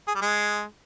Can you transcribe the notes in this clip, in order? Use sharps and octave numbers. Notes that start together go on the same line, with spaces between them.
G#4
G3
G#3